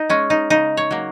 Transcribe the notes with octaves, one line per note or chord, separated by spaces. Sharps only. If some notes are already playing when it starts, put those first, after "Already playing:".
Already playing: D#4
G#3 C#4
D#4
C#3 D#4
C#5
F#3 A#3